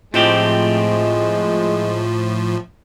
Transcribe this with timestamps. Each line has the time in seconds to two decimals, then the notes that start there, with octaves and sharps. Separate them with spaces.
0.14 A2 F3 G#3 A3 C4 G4